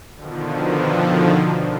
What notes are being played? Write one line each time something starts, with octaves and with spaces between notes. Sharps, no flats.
B2 D3 D#3 F3